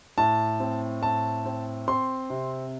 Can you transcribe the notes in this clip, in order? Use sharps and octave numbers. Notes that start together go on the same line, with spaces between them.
A2 A5
C4
A2 A5
C4
C4 C6
C3